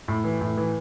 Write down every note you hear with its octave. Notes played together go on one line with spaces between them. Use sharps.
A2
E3
A2
E3